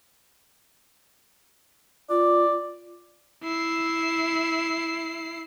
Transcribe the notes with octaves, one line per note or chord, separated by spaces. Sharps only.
F4 D5
E4 C7